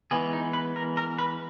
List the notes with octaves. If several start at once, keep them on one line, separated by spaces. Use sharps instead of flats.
E3 G#3 B3 G#4
D#4
B4
A#4
A#4
B4